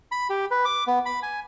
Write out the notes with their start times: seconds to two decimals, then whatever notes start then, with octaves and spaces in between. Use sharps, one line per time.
0.12 B5
0.30 G4
0.51 B4
0.65 D6
0.87 B3
1.06 B5
1.23 G#5